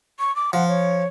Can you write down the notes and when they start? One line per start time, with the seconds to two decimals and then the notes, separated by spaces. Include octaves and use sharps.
0.20 C#6
0.36 D6
0.53 F3 F#5
0.69 C#5